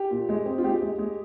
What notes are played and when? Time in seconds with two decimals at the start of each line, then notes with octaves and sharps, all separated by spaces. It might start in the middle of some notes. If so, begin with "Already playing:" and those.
Already playing: G4
0.11 A#2
0.29 G#3
0.46 C4
0.58 F4
0.64 G#3 G4
0.82 G#3
0.98 G#3